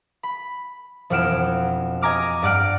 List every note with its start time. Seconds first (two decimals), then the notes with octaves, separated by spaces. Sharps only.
0.23 B5
1.10 E1 F2 F#5 F6 D7 E7
2.01 D#5 G#5 A#5 D6 F6
2.42 G2 D5 F#5 F6 D7